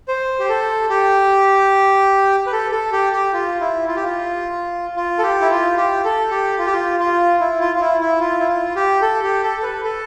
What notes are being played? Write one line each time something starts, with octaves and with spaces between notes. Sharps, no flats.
C5
G4
A4
G4
B4
A4
A4
G4
G4
F4
E4
F4
G4
F4
F4
A4
G4
E4
F4
G4
A4
G4
F4
G4
F4
F4
E4
F4
F4
E4
E4
F4
E4
F4
G4
A4
G4
A4
A4
B4
A4